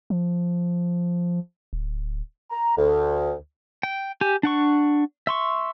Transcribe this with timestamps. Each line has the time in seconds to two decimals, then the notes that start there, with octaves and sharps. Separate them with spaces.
0.10 F3
1.73 D1
2.51 A#5
2.76 D2
3.83 G5
4.21 G4 G#5
4.43 D4 F#5 C#6
5.27 E5 C6 C#6